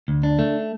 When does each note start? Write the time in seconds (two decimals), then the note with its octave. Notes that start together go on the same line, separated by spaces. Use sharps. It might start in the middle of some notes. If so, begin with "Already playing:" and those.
0.08 D2
0.23 D4
0.39 A3